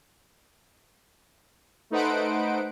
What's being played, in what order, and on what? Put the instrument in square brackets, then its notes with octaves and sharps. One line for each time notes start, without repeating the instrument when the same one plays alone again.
[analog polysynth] A3 D#4 B4 C5 F#5 D7